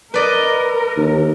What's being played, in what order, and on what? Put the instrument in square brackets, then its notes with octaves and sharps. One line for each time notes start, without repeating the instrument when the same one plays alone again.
[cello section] A#4 [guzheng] B4 D5 D#5
[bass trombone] D#2